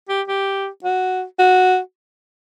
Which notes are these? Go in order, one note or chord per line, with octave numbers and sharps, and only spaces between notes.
G4
G4
F#4
F#4